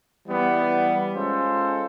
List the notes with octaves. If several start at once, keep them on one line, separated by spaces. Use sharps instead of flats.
E3 G3 B3
G#3 C#4 F4 A4 C5